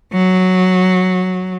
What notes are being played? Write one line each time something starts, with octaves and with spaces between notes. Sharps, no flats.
F#3